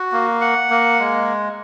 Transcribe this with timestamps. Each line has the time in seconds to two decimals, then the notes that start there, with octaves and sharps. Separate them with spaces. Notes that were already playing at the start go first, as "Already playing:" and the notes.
Already playing: F#4
0.12 A#3
0.41 F#5
0.70 A#3
1.00 G#3